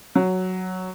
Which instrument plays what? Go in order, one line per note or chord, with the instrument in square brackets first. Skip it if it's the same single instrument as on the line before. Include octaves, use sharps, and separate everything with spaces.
[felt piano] F#3